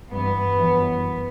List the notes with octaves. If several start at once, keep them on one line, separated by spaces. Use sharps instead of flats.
G2 E3 B3
F#2 E3